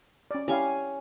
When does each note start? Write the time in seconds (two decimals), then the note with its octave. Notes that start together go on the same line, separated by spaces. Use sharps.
0.31 C#4 D5
0.48 C#4 E4 G4 C#5 F5 G#5